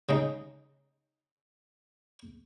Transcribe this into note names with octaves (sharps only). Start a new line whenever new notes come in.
C#3 G#3 D#4